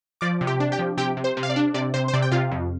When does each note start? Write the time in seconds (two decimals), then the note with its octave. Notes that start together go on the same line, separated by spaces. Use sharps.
0.21 F3 D5 D6
0.41 C3
0.47 G4 G5
0.60 D4
0.72 G4 G5
0.79 F3
0.97 C3 G4 G5
1.17 C3
1.24 C5
1.37 C3
1.43 F5
1.50 D5
1.56 D4
1.74 C3 D5
1.94 C3 C5
2.08 C5
2.14 C3 D5
2.22 G5
2.32 C3 F4 F5
2.51 F2